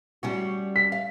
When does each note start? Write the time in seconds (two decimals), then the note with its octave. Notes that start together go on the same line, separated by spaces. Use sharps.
0.23 G3 C#4 F#4
0.76 B6
0.92 F5